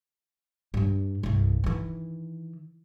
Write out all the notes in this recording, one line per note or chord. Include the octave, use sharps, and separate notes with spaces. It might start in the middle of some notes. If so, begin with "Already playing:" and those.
G2 D4
C2 G2
D#3 E3